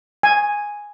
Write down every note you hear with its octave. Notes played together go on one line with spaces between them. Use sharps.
G#5